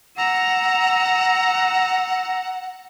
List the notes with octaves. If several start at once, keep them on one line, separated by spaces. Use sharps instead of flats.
F#5 A#5 E6